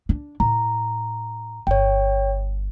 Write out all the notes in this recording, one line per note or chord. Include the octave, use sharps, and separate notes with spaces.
D4
A2 A#5
G1 C#5 G5